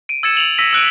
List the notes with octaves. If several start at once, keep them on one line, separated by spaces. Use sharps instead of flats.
D7 D#7
E6 G#6 A6 C#7 E7
D7 F7 F#7
E6 A#6 B6 D#7
E6 F#6 D7 D#7